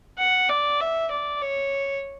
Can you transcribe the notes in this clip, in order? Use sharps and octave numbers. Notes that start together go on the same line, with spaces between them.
F#5
D5
E5
D5
C#5